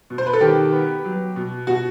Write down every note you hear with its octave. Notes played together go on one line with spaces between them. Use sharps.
B2
C5
B4
A4
D#3 G4
B3
F#3
B2
B2 F#4